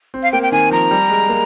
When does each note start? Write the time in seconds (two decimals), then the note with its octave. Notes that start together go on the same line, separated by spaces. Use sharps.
0.14 C4
0.23 F5
0.32 A#3 G5
0.42 G5
0.52 D#3 G#5
0.71 F3 A#5
0.91 G3
1.10 G#3
1.29 A#3